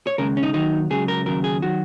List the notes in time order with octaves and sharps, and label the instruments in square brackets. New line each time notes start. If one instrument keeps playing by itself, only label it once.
[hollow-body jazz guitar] C#5
D#2 C#3 G#3 A#4
C#4
D#4
D#2 D#3 F#3 D#4
C#2 C#3 F#3 G#4
A#4
D#2 C#3 F#3 A#4
G#4
D#3 F#3 F#4